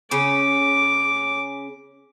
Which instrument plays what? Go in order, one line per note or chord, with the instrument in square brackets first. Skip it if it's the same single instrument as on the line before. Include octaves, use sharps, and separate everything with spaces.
[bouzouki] C#3 C#4 [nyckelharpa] D6